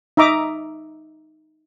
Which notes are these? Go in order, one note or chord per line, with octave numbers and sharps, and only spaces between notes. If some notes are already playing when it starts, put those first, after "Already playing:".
D#4 E5 A#5 D6 D#6